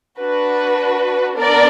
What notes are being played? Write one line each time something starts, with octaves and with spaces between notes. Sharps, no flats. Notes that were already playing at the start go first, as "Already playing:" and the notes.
D4 F#4 B4
B3 D4 A#4 D5